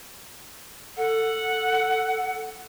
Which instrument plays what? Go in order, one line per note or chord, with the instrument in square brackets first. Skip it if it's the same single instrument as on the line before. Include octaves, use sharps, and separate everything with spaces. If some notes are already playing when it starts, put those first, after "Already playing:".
[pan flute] A4 [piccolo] F#5